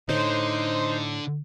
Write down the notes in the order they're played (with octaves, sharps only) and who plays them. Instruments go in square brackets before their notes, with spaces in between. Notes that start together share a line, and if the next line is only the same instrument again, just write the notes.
[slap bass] A2 [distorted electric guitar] D3 [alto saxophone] D#4 [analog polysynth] C5